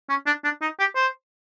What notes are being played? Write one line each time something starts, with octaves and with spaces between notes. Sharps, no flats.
C#4
D4
D4
D#4
G4
C5